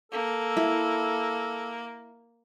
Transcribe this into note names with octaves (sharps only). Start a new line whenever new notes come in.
A#3 A4
E4